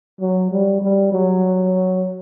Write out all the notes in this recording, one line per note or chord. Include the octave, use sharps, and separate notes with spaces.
F#3
G3
G3
F#3